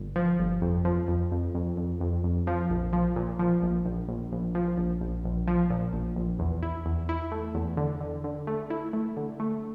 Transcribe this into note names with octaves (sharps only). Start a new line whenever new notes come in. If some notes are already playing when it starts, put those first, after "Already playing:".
Already playing: G1
F3
G1
F2
F3
F2
F2
F2
F2
F2
F2
F3
A#1
F3
A#2
F3
A#1
A#1
A#1
A#1
F3
A#1
A#1
A#1
F3
A#2
A#1
A#1
E2
E4
E2
E4
A3
E2
D3
D3
D3
A3
E4
A3
D3
A3